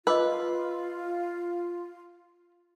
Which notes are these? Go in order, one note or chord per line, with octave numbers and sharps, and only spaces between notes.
F4 B4 D#5 D6 E6